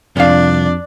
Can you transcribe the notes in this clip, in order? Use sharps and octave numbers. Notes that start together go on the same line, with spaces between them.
C2 F2 D4 F5